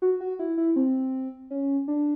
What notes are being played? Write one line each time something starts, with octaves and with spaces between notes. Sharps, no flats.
F#4
F#4
E4
E4
C4
C#4
D4